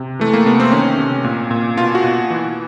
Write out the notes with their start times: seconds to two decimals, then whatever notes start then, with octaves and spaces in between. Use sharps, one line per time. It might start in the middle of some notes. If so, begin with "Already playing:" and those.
Already playing: C3
0.19 E3 A3
0.34 A#3
0.46 C3 B3
0.60 C4
0.72 D#3 C#4
0.98 C3
1.24 A#2
1.51 A#2
1.77 B2 F4
1.95 F#4
2.04 B2
2.30 E3